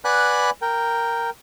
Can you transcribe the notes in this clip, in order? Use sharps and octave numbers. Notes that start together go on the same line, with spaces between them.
B4 D5 F#5 G#5 B5 F#6
A#4 G5